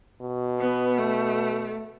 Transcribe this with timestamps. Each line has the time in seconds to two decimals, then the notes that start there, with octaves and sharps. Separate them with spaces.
0.21 B2
0.59 B3
0.98 A3